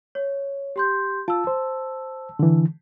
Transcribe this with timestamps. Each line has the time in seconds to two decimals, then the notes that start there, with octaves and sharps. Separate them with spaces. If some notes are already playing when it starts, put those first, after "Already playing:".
0.15 C#5
0.76 G4 C6 G6
1.28 F4 A5 E6
1.47 C5
2.39 D3 E3